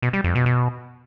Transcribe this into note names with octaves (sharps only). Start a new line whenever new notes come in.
B2
G3
F2
B2
B2